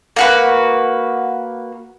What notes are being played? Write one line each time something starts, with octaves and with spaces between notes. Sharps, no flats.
A#3 F#4 B4